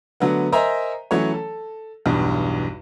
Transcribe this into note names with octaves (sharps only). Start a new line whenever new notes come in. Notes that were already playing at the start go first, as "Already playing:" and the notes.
D3 F#3 A3 B3
A#4 C5 D#5 E5 G#5 A#5
E3 F#3 A3 C#4 C#5
A4
B1 E2 G2